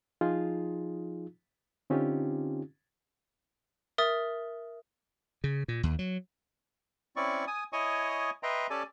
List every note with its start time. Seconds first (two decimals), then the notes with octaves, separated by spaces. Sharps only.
0.21 F3 D#4 F4 G#4
1.90 D3 C4 C#4 D#4 F4 G4
3.98 A#4 E5 D#6 A6
5.44 C#3
5.68 A#2
5.83 D#2
5.99 F#3
7.16 C4 C#4 E4 D5 C#6
7.47 G#5 D#6
7.73 E4 C#5 D#5 G#5 C#6 D#6
8.43 B4 D#5 E5 G5 A#5 C6
8.70 C#4 G4 A4 D5 G#5 A5